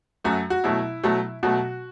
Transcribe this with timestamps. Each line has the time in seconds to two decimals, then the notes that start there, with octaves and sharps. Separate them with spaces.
0.24 F#2 F#3 A3 F#4
0.50 F#4
0.64 B2 F#3 A3 E4
1.03 B2 F#3 A3
1.43 B2 F#3 A3 F#4